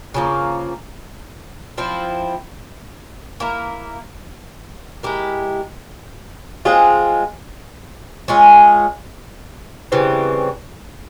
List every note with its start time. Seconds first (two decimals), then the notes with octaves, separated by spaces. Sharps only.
0.14 C#3 F3 A#3
1.78 F3 C4 E4
3.40 A#3 E4 A#4
5.03 G#3 E4 G4 A#4
6.65 G#3 C4 F4 G#4
8.28 G#3 C#4 F4 G#4
9.92 C#3 E3 G3 C4